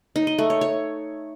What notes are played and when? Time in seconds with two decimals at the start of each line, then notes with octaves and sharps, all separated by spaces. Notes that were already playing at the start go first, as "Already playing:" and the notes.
0.16 D#4
0.27 D#5
0.38 A3
0.50 C#5
0.61 C#5